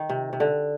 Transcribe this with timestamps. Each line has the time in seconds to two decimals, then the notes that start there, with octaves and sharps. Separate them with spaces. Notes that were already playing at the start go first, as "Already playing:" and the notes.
Already playing: D#3
0.09 C3
0.33 C3
0.40 D3